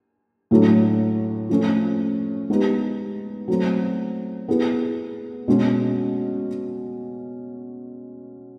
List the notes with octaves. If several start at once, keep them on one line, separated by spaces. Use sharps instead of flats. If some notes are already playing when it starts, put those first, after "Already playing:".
A2 F#3 A3 D4
F3 A3 C#4
G#3 B3 D#4 G4
F#3 A3 C4
B3 E4 G#4
B2 G#3 C#4